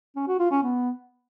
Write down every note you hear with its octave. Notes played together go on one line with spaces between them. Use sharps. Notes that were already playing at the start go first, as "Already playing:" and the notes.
C#4
F#4
F4
C#4
B3